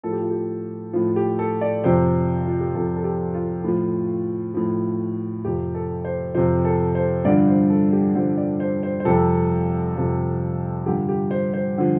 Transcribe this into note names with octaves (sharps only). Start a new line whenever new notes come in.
A2 F3 A4
G4
F4
G4
A2 F3 F4
G4
A4
D5
F2 C3 F3 C5
F4
G4
F2 C3 F3 A4
A4
G4
F4
A2 F3
A2 F3
F2 C3 F3 G4
A4
C5
F2 C3 F3 C5
A4
C5
G2 D3 F3 D5
C5
A4
G4
G2 D3 F3 C5
D5
C5
C5
C5
F2 C3 F3 A4
F2 C3 F3
G2 D3 F3 G4
G4
C5
C5
D3 F3